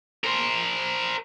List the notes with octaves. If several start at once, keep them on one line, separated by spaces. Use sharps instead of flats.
A#4 C5